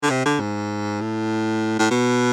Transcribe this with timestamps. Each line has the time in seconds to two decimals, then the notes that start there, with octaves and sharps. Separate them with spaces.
0.03 D3
0.10 C3
0.25 D3
0.40 G#2
1.01 A2
1.79 A2
1.90 B2